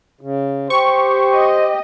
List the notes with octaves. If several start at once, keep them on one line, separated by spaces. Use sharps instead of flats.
C#3
G4 C5 C#6
D#5